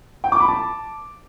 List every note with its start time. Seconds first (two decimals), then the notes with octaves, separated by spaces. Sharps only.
0.24 G5
0.32 D6
0.40 B5
0.48 A5